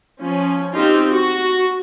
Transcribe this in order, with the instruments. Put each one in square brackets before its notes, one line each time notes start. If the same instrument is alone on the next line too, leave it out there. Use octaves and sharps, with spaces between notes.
[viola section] F3 C#4
C4 D#4 F4 G4
F#4